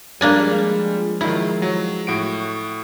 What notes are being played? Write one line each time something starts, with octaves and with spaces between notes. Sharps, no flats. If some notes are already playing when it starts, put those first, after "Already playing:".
F3 G3 G#3 A#3 D4 G#5
D#3 F#3 E4
F#3
A2 F#4 D7